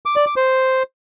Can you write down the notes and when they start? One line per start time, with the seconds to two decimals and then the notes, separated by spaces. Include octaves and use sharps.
0.06 D6
0.16 D5
0.26 D6
0.36 C5